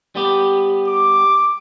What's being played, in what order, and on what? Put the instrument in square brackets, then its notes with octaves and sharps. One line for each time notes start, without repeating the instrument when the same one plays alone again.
[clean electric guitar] G3 B3 G4
[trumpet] D6